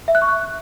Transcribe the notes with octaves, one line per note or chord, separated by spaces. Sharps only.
E5
F#6
C#6
F#6